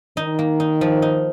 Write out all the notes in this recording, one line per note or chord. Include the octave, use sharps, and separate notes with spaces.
D#3 D#4
A#3
D#4
F3
D#4